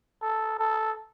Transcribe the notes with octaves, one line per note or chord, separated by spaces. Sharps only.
A4
A4